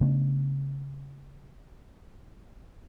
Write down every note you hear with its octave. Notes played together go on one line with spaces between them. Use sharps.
C#3 A3 B3 D4